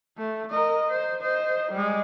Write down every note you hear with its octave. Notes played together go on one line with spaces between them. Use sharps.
A3
A#4 D#5
C5
C5 D#5
G3 G#3